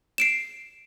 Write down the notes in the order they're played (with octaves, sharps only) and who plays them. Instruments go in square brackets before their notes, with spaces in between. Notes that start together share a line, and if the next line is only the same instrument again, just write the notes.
[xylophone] C7 D7 E7